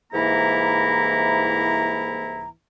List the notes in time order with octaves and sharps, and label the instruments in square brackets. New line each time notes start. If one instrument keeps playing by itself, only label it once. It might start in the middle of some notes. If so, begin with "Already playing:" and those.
[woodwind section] C2 G#2 E3 A#3 E4 A#5